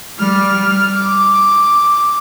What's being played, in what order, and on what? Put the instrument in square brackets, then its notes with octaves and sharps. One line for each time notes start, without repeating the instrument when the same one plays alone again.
[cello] G3 [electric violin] F6
[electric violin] D6